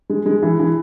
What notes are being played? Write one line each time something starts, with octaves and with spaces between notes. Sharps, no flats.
G#3
G#3
E3
E3